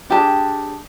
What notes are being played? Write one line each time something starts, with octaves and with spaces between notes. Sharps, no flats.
D4 G4 G#4 A5